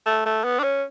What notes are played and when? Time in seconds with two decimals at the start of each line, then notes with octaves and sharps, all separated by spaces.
0.06 A3
0.26 A3
0.44 B3
0.59 D4
0.63 C#4